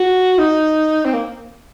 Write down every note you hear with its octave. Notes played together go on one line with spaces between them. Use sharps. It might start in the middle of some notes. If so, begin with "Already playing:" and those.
Already playing: F#4
D#4
C4
A#3